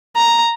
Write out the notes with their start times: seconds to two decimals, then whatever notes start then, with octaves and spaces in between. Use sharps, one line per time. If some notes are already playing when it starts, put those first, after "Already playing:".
0.16 A#5